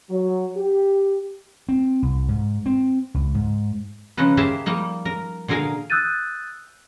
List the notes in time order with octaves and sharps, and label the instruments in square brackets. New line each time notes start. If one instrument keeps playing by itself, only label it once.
[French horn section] F#3
G4
[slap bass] C4
C2
G#2
C4
C#2
G#2
[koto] C#3 F3 C#4 D#4 B4
A#3 G4 G#4 C5 E5 A5
F3 G3 A#3 D#4
A#4
A#2 D3 G#4 A#4 F5 G#5
[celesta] D#6 E6 F#6 G6 A6 D#7